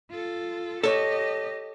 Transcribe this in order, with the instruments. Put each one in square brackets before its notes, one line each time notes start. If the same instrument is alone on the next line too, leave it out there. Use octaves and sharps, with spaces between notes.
[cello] F4 A4
[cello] G4 D#5 [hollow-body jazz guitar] A4 C#5